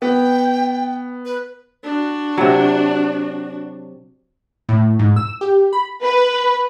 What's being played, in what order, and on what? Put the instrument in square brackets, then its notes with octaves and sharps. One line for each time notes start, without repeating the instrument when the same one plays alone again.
[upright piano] B3 [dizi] G5
[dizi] B4
[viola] D4 F#4
[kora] C3 F#3
[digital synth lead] A2
G#2
E6
G4
B5
[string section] B4